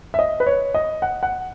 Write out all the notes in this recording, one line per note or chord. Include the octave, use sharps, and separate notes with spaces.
E5
D#5
B4
C#5
D#5
F#5
F#5